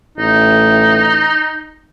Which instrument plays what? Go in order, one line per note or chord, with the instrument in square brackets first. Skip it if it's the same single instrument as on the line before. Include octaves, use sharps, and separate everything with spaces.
[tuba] A1 [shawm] D#4